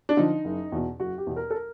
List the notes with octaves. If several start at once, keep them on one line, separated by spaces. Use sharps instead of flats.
D4
D3 F3 D#4
F#1
E2 B2
F#1 F#4
G4
E2 B2
A#4
A4
A#4